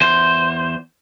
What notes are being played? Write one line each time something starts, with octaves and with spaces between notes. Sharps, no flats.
E2 C5